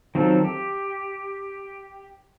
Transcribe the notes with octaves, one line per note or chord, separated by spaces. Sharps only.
D#3 F#3 C4 F4 A4
G4